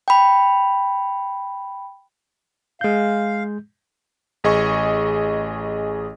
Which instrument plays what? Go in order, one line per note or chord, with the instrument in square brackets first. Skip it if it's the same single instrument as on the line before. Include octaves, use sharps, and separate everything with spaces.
[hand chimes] G5 B5
[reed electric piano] G#3 G6 [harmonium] F5
[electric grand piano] A1 G#4 D#5 C#6